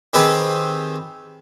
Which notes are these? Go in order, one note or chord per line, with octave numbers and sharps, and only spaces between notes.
D#3 C4 G4 G#4 B4 C5